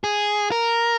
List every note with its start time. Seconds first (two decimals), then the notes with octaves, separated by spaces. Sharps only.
0.04 G#4
0.52 A#4